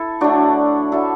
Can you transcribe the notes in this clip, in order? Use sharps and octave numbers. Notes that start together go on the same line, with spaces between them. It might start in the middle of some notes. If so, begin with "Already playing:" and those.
Already playing: E4 A4
D3 F#3 A3 D4 F#4
D3 F#3 A3 E4 A4